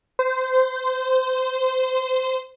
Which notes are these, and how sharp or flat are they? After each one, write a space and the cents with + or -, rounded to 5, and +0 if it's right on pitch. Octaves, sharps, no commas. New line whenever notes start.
C5 -20